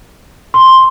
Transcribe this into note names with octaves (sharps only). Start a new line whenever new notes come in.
C6